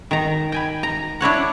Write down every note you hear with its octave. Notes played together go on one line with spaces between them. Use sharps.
D#3 A#5
G5 G#5 B5
A#5
D4 E4 C#5 F#5